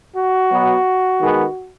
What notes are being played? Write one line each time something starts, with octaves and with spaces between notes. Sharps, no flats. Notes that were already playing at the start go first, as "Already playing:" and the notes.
F#4
B2 F#3 B3
D#3 G#3 B3